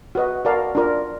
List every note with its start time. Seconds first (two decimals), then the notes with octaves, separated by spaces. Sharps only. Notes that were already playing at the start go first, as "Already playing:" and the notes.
0.15 F#4 B4 D#5
0.45 F#4 A#4 D5 F5 A5
0.75 D4 F4 A#4 D5